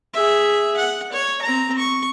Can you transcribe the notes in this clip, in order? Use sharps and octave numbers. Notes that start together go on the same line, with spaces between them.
G#4 E5
F#5
C#5
C4 A#5
C#6